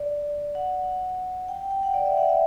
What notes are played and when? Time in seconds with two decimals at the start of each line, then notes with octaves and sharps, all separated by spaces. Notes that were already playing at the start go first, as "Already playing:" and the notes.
Already playing: D5
0.55 F#5
1.48 G5
1.71 G5
1.83 F#5
1.94 D5
2.06 E5
2.17 F#5
2.29 E5